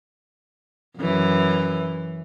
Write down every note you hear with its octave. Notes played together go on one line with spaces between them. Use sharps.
F#2 E3